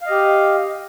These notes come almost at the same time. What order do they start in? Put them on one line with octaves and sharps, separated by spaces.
F5 D#5 G4